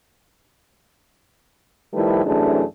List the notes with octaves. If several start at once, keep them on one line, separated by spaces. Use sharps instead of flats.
D#3 F3 G3 A3 E4 B4
F#2 C3 E3 A3 D4 G#4